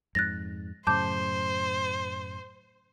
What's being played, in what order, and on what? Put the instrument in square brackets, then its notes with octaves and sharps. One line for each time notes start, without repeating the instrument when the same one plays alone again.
[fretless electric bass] F2 G#2 [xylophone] F#6 A6 A#6
[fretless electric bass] F#2 A2 C#3 [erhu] C5 [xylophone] A5 D6 G6